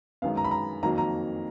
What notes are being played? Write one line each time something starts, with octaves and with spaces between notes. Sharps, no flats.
F#2 D#3 G#3 B3 F5
A#5
B5
A#5
F2 D#3 F#3 A#3 A#5
A#5